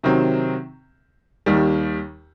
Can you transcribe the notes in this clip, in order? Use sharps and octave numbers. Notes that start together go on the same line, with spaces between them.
C3 D#3 F#3 C4
D#2 D#3 G3